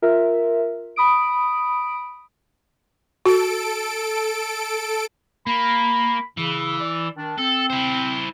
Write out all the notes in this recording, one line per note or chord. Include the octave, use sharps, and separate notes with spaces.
F4 A#4 E5
B5 D#6 D7
F#4 A4 D7
A#3 B5
C#3 E3
D5
D#3 D4
C4 A4
E4 C5